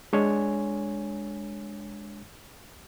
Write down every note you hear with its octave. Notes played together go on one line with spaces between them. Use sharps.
G#3 D4 C#5 G#5